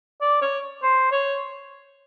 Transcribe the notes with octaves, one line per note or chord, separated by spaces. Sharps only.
D5
C#5
C5
C#5